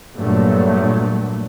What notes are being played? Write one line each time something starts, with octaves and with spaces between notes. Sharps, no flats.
G2 A#2 F#3 A3